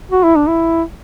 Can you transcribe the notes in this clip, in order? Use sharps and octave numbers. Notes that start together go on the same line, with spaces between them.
F#4
E4
D4
E4